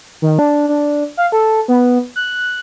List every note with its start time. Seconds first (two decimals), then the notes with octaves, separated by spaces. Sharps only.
0.22 D#3
0.39 D4
0.69 D4
1.17 F5
1.32 A4
1.68 B3
2.16 F#6